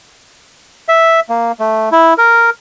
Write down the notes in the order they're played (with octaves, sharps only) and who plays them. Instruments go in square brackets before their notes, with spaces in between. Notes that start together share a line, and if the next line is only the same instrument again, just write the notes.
[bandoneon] E5
A#3
A3
E4
A#4